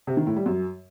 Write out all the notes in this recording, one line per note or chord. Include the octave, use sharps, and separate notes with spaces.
C3
D#3
A2
G3
F#2